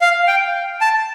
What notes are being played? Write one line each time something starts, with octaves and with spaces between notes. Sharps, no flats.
F5
G5
A5